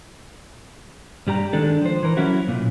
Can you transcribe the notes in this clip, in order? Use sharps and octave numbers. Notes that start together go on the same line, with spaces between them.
G2 G3 G4 A#5
D#3 G#3 D4 A4
F3 C5
E3 A#4
F#3 C#4 E4 F#4
B1 F2 A#2